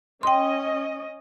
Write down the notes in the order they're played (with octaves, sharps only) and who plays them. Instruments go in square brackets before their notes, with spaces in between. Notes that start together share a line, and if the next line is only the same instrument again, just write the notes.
[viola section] C#4 D#5 [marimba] G5 C6